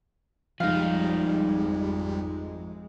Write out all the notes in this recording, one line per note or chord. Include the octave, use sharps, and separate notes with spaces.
G#1 F2 F3 G3 G#3 D#4 F5